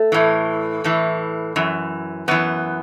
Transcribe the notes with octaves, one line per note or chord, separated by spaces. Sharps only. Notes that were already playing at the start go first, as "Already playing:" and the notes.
Already playing: A3
A2 E3
A2 E3
F#2 E3
F#2 E3 B3